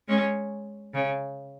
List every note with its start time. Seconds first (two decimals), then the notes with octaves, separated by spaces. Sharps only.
0.08 G#3 C#4
0.94 C#3